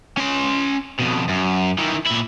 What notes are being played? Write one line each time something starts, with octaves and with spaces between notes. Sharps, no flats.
C#4 C6
F2 B2
F#2
D#3 E3
A#2 E4